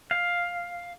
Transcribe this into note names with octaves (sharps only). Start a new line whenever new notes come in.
F5